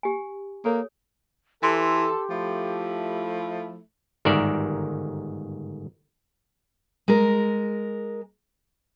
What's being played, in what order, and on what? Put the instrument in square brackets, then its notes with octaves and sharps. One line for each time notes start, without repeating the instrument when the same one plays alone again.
[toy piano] G4 G#5
[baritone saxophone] A#3 [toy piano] A4 C#5
[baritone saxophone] E3 [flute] G4 [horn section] A4 [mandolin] C6
[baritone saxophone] F3 [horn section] A3 E4
[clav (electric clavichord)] G1 G#2 D#3 A#4 D5 E5
[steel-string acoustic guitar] G#3 A#4